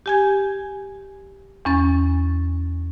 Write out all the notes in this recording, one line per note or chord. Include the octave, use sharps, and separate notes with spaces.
G4 G#5 G#6
E2 C#4 A6